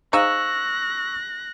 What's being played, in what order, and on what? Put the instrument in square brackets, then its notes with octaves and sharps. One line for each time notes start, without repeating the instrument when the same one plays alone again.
[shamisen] D#4 G#4 [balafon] C5 F5 [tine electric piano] C#6 E6 [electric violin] F#6 A#6